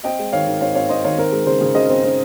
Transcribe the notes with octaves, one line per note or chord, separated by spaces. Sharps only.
C4 D#5 G5
G#3
D#3 C#5 F5
D#3
C4 C#5 F5
C4 C#5 F5
C4 C5 D#5
D#3 C#5 F5
C4 A#4
G#3
C#3 C5
C#3
C#3 C5 D#5
C4
C4